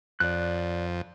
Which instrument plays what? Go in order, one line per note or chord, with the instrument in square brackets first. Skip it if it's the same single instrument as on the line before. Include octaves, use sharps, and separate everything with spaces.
[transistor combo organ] F2 [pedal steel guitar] D5 F#6